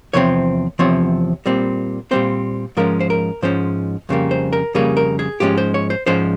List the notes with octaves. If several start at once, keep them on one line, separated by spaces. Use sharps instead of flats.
E2 C3 F3 C4 C#5
E2 C3 F3 C4 C#5
A#2 G3 C4
A#2 G3 C4 C5
G#2 F3 G#3 C#4 A#4
C5
A#4
G#2 F3 G#3 C#4 C5
F2 C#3 G3 A#3
C5
A#4
F2 C#3 G3 A#3 G#4
A#4
G#4
G#2 F3 G#3 C#4 G4
C5
C#5
C5
G#2 F3 G#3 C#4 C5